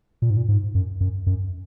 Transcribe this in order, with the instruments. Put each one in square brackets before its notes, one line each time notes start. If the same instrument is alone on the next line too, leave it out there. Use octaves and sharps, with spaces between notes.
[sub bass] A#2
G#2
A#2
G#2
F#2
F#2
F#2